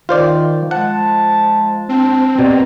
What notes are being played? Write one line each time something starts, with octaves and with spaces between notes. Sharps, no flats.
D#3 F4 C5 D5
F3 G#3 F#5 A5
C4 D4
B2 G4 D5 A#5